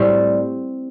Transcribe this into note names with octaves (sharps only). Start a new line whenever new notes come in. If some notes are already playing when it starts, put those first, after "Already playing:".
Already playing: A2 G3 C4